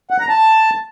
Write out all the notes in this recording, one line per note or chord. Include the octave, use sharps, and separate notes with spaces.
F#5
A#5
A5